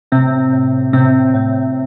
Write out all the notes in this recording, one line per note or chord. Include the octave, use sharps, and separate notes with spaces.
A2 C3 C4
A2
A2 C3 C4
A2